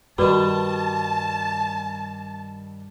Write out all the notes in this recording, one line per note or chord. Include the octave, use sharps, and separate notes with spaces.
G2 D#3 G3 F#4 B4 D5 A5